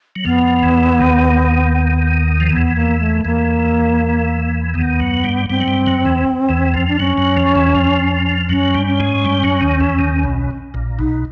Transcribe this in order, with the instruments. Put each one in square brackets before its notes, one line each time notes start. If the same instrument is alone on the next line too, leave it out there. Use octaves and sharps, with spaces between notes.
[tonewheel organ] F#3
[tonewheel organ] F2 F3 [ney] B3
[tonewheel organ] E2 E3
D#2 D#3
F3
[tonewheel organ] E2 E3 [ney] B3
[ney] A#3
A3
[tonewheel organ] E2 E3 [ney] A#3
[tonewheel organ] D#2 D#3 [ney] B3
[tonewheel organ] F#2 F#3
G2 G3
[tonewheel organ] G2 G3 [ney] C4
[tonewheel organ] F#3
G2 G3
F#2 F#3
E2 E3
E2 E3
F2 F3
[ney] D4
[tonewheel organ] F#2 F#3 [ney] C#4
[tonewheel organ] F#2 F#3
F2 F3
E2 E3
F2 F3
[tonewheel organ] F#2 F#3 [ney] C#4
[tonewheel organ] G2 G3
[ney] C#4
[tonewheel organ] G#2 G#3
G2 G3
F#2 F#3
D#2 D#3
E2 E3
D#2 D#3
B1 B2
A#1 A#2
[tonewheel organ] B1 B2 [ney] D#4